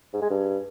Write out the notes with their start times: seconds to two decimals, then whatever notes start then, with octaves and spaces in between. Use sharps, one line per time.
0.13 G#2
0.22 G#3
0.30 G2